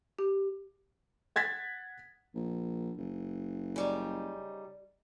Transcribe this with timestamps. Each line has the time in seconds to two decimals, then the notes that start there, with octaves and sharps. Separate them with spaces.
0.19 G4
1.36 F#5 G#6 A6 B6
2.35 A#1
2.97 F#1
3.76 C#3 G3 D#4